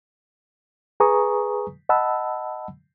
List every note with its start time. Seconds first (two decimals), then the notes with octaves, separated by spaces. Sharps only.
1.00 G#4 B4 G#5 A#5 C#6 D#6
1.89 D#5 F#5 A5 B5 E6